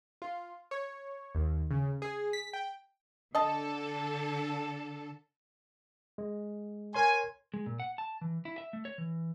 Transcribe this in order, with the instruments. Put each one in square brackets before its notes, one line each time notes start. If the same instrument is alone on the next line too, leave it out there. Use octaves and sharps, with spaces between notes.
[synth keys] F4
C#5
D#2
C#3
G#4
B6
G5
[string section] D3 A4 [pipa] D#5 A5
[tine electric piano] G#3
[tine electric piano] A#4 C#5 C6 [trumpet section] G#5
[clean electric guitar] G#3
A#2
F#5
A5
E3
E4
E5
A3
C#5
E3